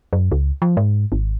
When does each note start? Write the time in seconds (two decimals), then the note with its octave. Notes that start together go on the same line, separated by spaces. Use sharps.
0.13 F#2
0.32 C#2
0.62 F3
0.77 G#2
1.12 G#1